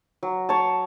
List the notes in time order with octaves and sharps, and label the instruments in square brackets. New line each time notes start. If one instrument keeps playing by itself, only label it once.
[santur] F#3
C#5 A5